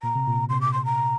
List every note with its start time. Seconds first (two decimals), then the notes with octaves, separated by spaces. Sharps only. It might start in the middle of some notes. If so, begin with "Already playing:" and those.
0.03 A#2 A#5
0.15 C3
0.27 A#2
0.38 A#2
0.49 C3 C6
0.61 D6
0.73 C6
0.85 A#5